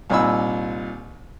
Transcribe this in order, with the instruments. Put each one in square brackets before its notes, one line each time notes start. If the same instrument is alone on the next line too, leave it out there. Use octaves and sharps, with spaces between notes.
[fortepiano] C2 A#2 D#4 G#5 B5 E6